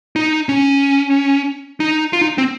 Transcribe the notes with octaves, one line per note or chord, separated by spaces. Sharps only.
D#4
C#4
D#4
F4
D#4
C4